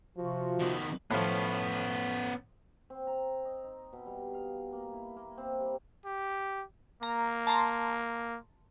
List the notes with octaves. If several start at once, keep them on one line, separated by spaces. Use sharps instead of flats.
C3 F3 F4 F#4
D#3 B3
A2 F3 B3 C#4
C4
A#5
D#5
D#4
B2
G3
F5
A#3
E4
A#3
C4
G3
G4
A#3 A#5
A5 A#5 C6